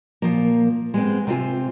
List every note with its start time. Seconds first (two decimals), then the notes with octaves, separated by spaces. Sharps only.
0.22 A#2 F3 A#3
0.94 G#3 B3 C4
1.27 C3 C4 F4 G#5